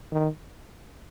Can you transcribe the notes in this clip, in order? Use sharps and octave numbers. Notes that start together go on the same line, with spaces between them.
D#3